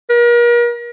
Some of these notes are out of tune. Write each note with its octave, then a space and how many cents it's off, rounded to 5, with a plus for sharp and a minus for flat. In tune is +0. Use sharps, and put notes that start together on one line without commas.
A#4 +40